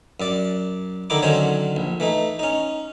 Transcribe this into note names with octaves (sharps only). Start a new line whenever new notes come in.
F#2 D5
D3 D#3 D#4 E4 D6
D3 D#3 F#3 C#4 C5 C#5
A#1
E3 A3 D#4
C#4 D#4